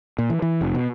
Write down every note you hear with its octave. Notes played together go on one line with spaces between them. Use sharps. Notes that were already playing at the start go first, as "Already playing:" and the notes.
A#2
E3
E3
F1
B2